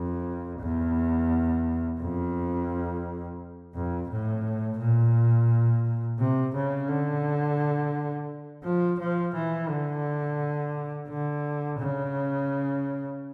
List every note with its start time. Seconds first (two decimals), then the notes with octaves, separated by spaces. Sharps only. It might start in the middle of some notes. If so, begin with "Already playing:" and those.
Already playing: F2
0.60 E2
2.00 F2
3.74 F2
4.10 A2
4.79 A#2
6.18 C3
6.55 C#3
6.88 D3
8.64 F3
8.99 F3
9.34 E3
9.69 D3
11.08 D3
11.79 C#3